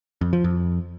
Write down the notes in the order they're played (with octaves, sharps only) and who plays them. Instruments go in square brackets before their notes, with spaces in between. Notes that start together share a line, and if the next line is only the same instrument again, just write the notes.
[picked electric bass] F2
F3
F2